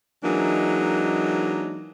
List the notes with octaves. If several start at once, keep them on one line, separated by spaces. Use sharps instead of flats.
E3 F#3 G#3 A#3 D4 D#4